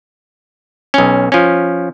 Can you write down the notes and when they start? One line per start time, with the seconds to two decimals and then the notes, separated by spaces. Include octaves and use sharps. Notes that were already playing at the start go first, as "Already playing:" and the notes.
0.94 B1 C#4
1.32 F3 C#4